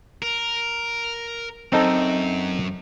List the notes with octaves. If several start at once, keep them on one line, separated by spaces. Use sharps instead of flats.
A#4
F#2 C4 D#4 A4